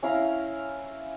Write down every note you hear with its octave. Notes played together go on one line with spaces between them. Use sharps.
C#4 E4 F5 A#5